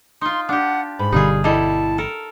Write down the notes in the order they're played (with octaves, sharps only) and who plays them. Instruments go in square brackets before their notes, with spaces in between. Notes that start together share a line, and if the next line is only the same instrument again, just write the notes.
[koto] D#4 F4 [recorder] C6
[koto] D4 G4 [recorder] F#5
[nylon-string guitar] G#2 [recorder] B5
[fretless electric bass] G1 B2 D3 [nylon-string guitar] G3 [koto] D#4 F4 G#4
[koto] G3 A4 [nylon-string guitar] E4 D#5 E5 [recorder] A5
[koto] A4 A#4